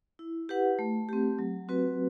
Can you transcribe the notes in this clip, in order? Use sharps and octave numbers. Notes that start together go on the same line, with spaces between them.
E4
G4 B4 F#5
A3
C4 G4
F#3
C4 F#4 B4